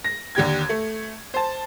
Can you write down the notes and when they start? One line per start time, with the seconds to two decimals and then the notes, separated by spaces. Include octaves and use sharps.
0.04 A#6
0.35 D#2 D3 G4 G#6
0.69 A3
1.34 C5 A5